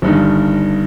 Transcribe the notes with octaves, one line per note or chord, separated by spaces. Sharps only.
G1 G2 D#3